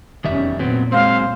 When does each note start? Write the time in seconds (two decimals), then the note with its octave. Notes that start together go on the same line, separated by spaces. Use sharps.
0.24 F1 E2 D#3 G3 C#4 E5
0.59 A#2 F#3 B3 C4
0.92 F#3 G#3 C4 C5 F5